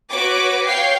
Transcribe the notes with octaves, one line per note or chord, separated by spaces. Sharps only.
F#4 B4 C#5 D6
C#5 F5 G5 C7